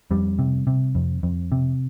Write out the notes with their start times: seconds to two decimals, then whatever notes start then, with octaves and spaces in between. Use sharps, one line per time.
0.11 F2 G3
0.39 C3
0.67 C3
0.95 F2
1.23 F2
1.52 C3